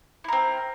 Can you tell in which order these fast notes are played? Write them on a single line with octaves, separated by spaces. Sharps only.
E4 A#4 C4